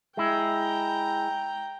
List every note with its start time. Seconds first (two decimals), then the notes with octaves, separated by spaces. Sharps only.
0.17 G#3 E4 G5 A#5